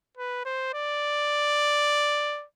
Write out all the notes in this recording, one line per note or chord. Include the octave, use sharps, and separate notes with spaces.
B4
C5
D5